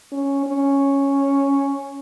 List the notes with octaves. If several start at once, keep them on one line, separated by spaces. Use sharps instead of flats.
C#4
C#4